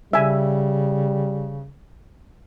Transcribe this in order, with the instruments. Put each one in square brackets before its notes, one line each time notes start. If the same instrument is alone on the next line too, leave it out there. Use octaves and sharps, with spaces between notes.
[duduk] C#3 [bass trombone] G3 [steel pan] E5 G#5